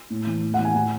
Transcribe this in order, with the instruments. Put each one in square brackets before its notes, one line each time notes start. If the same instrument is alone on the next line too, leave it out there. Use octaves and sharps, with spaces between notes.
[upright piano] A2
E3
A2
F#5
E3
G#5
A2 G#5